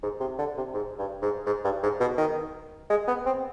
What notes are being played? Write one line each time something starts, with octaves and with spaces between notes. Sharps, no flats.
G#2
C3
D3
C3
G#2
G2
G#2
G#2
G2
G#2
B2
D#3
G#3
B3
C4